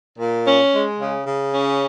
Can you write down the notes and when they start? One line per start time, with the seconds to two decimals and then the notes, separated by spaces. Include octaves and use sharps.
0.19 A#2
0.46 C#4
0.73 G#3
0.99 C#3
1.26 C#3
1.54 C#4